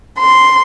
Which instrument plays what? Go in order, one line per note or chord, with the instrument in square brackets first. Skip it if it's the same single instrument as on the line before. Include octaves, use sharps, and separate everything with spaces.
[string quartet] C6